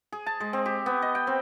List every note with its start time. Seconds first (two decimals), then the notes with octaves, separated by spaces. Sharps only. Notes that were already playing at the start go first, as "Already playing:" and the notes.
0.12 G#4
0.26 A5
0.40 G#3
0.53 C4
0.66 G4
0.86 B3
1.02 D#5
1.15 G5
1.27 C4